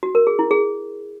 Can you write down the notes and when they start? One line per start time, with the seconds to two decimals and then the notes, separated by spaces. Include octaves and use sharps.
0.03 F#4
0.15 A#4
0.27 G#4
0.39 E4
0.51 G#4